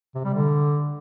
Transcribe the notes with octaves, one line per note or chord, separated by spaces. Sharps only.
C3
G3
D3